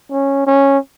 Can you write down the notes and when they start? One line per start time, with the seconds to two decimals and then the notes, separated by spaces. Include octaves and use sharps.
0.11 C#4
0.46 C#4